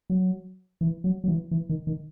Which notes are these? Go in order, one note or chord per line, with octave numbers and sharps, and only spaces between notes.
F#3
E3
F#3
F#3
E3
E3
D#3
D#3